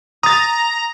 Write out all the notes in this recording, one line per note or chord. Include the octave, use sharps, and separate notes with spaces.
A#5 D#6 A6